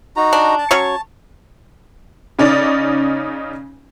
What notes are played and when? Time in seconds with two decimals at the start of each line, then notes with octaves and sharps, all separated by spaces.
0.16 D#4 F#4 A#5
0.33 D4
0.58 A5
0.71 F#3 C#4 C#5
2.39 C#3 C#4 D#4 D5